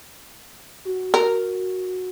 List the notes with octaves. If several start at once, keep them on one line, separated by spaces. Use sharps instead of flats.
F#4
A#4